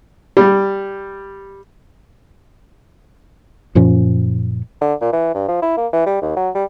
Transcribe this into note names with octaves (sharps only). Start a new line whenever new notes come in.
G3
F#2 A#2 F3 C#4
D3
A#2
E3
G2
F3
E4
A#3
E3
G3
D#2
F#3
G3